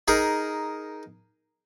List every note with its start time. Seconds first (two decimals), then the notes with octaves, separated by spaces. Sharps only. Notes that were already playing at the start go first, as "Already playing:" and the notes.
0.08 D#4 G#4 A#4